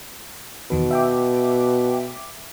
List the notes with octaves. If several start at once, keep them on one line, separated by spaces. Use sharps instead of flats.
E2 B2 D#3 B4
E5 G5 D6